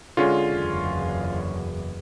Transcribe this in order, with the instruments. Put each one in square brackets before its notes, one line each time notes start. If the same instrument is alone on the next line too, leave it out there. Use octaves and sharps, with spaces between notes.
[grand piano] D3 G#3 C#4 [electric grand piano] F4
[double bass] F#1 E2